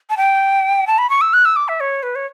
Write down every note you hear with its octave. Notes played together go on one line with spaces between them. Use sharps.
A5
G5
A5
B5
C#6
E6
F#6
E6
D6
E5
C#5
B4
C#5